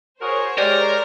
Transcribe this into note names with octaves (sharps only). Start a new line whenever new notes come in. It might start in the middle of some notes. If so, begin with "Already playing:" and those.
F#4 G#4 A#4 C5 C#5
G#3 G4 A#4 D5